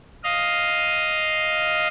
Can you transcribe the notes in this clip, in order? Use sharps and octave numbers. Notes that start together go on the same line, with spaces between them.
D#5 F5